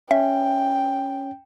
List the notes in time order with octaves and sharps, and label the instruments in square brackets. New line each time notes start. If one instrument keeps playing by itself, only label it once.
[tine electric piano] C#4 [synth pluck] E5 [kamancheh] G5